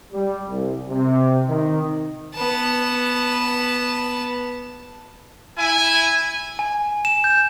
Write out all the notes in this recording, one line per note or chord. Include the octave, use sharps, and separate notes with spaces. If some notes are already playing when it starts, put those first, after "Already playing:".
G3
C2
C3
D#3
B3 A5
E4 G#5
G#5
E7
G6